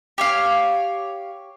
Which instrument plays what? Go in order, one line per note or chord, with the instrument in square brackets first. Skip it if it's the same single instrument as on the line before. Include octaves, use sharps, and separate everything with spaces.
[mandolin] G4 C#5 F5